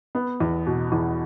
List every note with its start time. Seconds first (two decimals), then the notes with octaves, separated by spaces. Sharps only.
0.15 B3
0.40 E2
0.67 B2
0.92 E2